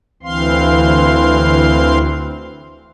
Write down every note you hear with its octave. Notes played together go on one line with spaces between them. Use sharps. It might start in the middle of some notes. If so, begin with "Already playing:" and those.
D2 E3 C4 F5 C6